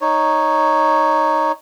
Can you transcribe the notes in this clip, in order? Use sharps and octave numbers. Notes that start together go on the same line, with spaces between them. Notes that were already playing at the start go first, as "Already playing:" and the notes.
D#4 C#5